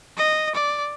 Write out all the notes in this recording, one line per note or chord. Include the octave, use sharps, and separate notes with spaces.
D#5
D5